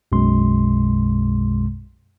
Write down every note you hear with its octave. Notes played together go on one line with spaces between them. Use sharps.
B1 F#2 B2 G#3 C6